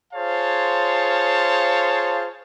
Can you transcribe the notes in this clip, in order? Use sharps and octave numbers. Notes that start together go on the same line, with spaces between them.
F4 G#4 C5 C#5 F5 A5